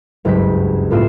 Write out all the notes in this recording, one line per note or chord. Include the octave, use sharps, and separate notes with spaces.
F#1 C#2 G2 G6 B6
A2 B3 F4 E6 C7 E7